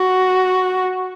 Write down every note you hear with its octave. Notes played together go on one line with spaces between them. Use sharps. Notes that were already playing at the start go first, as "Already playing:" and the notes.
Already playing: F#4